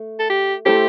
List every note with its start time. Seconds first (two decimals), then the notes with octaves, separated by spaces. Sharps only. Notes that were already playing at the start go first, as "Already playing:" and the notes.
Already playing: A3
0.19 A4
0.29 G4
0.65 A3 E4 G4 A4 C5